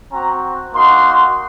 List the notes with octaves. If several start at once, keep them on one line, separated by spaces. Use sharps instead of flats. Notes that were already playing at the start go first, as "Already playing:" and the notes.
C4 F#4 A#5
A#3 D#4 F#4 C6